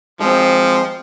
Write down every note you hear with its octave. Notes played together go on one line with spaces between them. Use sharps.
F3 G#3 C4